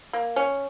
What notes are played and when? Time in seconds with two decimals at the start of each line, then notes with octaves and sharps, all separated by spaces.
0.13 A#3
0.36 C#4